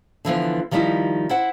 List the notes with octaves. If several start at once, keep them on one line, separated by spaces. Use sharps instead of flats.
D3 E3 F3 B3
D#3 F3 G3 D#4 E4
E4 C5 F#5